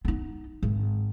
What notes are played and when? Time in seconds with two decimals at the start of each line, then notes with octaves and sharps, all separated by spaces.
0.05 B3 D#4
0.63 G#1